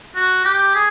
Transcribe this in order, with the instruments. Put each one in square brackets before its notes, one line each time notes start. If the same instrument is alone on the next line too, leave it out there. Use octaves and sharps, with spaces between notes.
[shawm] F#4
G4
G#4